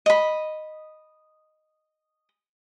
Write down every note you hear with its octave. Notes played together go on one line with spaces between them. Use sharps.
D#5 B5